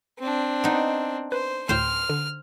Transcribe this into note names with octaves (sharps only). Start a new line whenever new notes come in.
C4 D4
B3 D#4
B4 C5
D2 A2 C5 G5 F6
D3